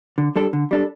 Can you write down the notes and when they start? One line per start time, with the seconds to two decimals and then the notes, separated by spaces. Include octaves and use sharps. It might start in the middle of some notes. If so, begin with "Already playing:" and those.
0.18 D3
0.36 G3 D4 A4
0.53 D3
0.71 G3 D4 A4